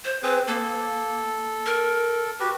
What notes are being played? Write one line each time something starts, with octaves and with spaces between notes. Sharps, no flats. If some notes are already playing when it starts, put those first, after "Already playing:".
C5
C4 G#4 B4
A#3 A4
A#4
F#4 G4 B4